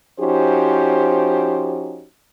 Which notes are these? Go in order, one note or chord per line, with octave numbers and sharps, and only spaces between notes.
F3 C#4 D#4 F#4 G4 C5